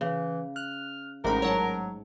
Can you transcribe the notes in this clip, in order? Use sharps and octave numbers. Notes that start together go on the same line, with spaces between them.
C#3 E3
F6 F#6
A1 G#2 D#4 A#4 B5
F#3 C#5 F#5 A5